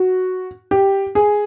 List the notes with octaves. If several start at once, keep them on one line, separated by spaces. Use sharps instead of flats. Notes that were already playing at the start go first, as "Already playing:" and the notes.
Already playing: F#4
G4
G#4